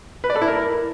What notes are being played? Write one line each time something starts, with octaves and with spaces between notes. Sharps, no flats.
B4
D5
A4
E4
A#4